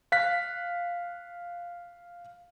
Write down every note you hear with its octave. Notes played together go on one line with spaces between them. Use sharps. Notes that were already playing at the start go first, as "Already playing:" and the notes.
F5 F#6 B6